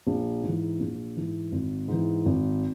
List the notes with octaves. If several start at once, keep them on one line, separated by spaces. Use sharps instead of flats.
A#1
G#2
E3
A#1
G#2 E3
G#1
G#2 E3
G#1